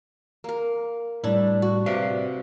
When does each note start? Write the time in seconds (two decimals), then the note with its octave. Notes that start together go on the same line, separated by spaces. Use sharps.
0.44 A#3 A#4
1.24 A2 G3 D4 E4
1.62 F#4
1.86 C3 B4 D5 E5 F5